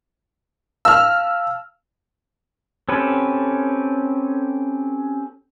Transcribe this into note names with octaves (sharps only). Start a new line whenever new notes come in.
F5 A5 E6 F6
C4 C#4 G4 A4 B4